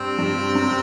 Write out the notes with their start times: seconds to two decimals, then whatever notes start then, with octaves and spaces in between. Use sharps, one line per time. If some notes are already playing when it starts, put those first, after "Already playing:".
Already playing: G2 C4
0.18 G2
0.55 F#2